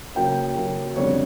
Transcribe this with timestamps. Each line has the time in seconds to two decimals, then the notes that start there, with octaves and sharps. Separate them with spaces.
0.15 C#3 F#3 A#3 G5
0.55 C#3 F#3 A#3
0.96 F2 D3 G3 B3 C#5